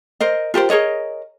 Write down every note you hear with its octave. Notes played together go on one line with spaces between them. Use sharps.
A#4 C5 D#5
F4 G4 A#4 C5
G#4 A#4 C#5 D#5